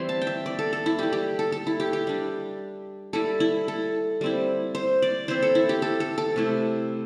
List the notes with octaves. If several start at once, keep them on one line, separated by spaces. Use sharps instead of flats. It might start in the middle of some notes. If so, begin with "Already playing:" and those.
Already playing: E3 G3 C4 E4 C6
A5
G5
E5
D5
A4
A4
E4
G3 E4 G4
G4
A4
A4
E4
G4
G4
G3 D4
G3 E4 A4
E4
A4
G3 C4 E4
C5
D5
E3 C4 E4 C5
A4
E4
G4
A4
A4
A4
C3 A3 E4